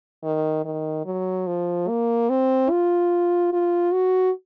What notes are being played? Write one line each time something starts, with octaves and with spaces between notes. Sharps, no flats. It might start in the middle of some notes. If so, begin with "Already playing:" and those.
D#3
D#3
F#3
F3
A#3
C4
F4
F4
F#4